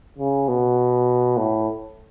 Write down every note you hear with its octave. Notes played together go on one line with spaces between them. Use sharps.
C#3
B2
A2